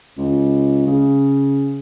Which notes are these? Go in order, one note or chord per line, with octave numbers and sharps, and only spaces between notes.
C#2
C#3